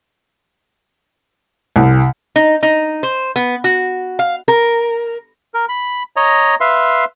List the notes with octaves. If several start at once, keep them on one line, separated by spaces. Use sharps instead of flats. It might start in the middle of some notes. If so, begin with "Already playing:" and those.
C2
D#4
D#4
C5
B3
F#4
F5
A#4
A#4
B5
C#5 D#5 A#5
B4 E5 F5 C6